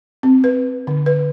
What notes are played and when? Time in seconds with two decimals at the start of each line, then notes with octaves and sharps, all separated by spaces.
0.23 C4
0.44 B4
0.87 D3
1.06 B4